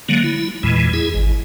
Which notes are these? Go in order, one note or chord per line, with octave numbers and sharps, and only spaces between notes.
D3 F#3 G#3 A#3
E4
E2 A#2 E3 G#3
E4 G#4
G#1